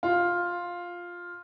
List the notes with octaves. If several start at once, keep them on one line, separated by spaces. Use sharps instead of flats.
F4